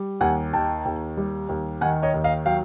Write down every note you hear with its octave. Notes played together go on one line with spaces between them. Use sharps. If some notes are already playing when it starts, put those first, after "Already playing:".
Already playing: G3
D#2 F#5 G#5
D#3 G5 A5
D#2
G3
D#2
D#3 F#5 G#5
C#5 D#5
D#2
D#5 F5
F#3 F5 G5